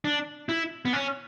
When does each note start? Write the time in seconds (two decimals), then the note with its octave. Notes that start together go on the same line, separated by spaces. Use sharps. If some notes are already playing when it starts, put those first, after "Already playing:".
0.05 D4
0.49 E4
0.85 B3
0.93 C#4